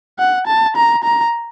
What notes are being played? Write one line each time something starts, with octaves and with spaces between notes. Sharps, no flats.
F#5
A5
A#5
A#5